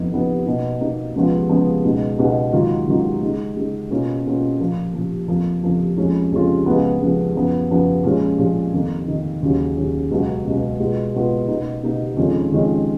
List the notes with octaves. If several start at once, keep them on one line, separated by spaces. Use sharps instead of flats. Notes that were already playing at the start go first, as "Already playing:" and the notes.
Already playing: F2 F3 B3 D#4
F2 F3 B3 D#4
B2 A#3 D#4
B2 A#3 D#4
C#2 C#3 F3 B3 F4
C#2 C#3 F3 B3 F4
C#2 B2 G#3 D#4
C#2 B2 G#3 D#4
G#2 D#3 F#3 A#3 F4
G#2 D#3 F#3 A#3 F4
C#3 G#3 D#4
C#3 G#3 D#4
B2 A#3 C#4 F4
B2 A#3 C#4 F4
A#2 F3 A#3
A#2 F3 A#3
F2 F3 A#3
F2 F3 A#3
F2 F3 G#3 C#4 F4
F2 F3 G#3 C#4 F4
C#2 C#3 F3 B3
C#2 C#3 F3 B3
F#2 F3 B3
F#2 F3 B3
A#2 F3 G#3 C#4
A#2 F3 G#3 C#4
F2 D#3 A#3
F2 D#3 A#3
D#2 C#3 F#3 C#4
D#2 C#3 F#3 C#4
C#2 B2 F#3
C#2 B2 F#3
B2 G#3 B3 F4
B2 G#3 B3 F4
B2 A#3 D#4
B2 A#3 D#4
F2 D#3 G#3 C#4 F4
F2 D#3 G#3 C#4 F4